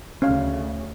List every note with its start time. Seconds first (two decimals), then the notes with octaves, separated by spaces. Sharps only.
0.22 D2 C#3 C#4 C#5 F5